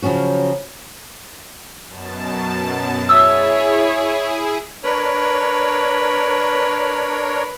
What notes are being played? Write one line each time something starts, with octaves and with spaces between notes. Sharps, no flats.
C#3 F3 F#3 C#4 F#4
F#2 B2 A5
E4 G#4 C#5 E5 D#6 E6
D4 A#4 B4 C#5